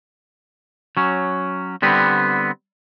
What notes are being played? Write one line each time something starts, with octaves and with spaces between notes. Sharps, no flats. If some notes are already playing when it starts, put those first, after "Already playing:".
F#3 C#4
D3 G3 B3 C4 B4